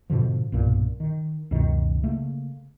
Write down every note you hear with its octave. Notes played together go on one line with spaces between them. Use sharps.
G#2 B2 D3 F3
B1 G2 A#2
D#3
C#2 F#2 B2 D#3
C#3 A3 A#3